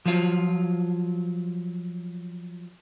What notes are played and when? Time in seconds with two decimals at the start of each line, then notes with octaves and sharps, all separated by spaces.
0.06 F3 F#3 F4